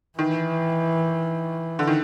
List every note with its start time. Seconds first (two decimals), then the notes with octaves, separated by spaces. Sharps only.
0.19 D#3 E3
1.79 D3
1.87 D#3